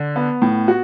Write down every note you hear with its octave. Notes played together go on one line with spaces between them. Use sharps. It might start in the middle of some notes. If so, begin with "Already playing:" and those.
Already playing: D3
B3
A2
F#4